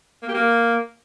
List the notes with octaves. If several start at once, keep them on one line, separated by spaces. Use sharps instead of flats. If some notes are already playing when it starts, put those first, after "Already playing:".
A#3
G4
A#3